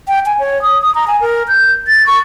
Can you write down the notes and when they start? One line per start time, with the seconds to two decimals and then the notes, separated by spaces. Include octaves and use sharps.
0.08 G5
0.26 G#5
0.39 C#5
0.62 D#6
0.82 D#6
0.95 A#5
1.08 G#5
1.21 A#4
1.48 G6
1.88 A6
2.06 C#6